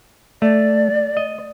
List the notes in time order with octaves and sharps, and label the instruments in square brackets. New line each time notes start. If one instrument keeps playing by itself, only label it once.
[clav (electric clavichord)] A3 [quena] D5
[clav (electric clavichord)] D#5